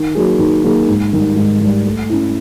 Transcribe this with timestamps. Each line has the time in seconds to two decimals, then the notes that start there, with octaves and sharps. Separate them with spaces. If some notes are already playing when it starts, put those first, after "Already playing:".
Already playing: D#3
0.15 F#3 A#3 D#4 G#4
0.39 D#3
0.64 F#3 A#3 D#4 G#4
0.88 G#2
1.13 D#3 G3
1.36 G#2
1.60 D#3 G3
1.85 A3
2.09 C#4 E4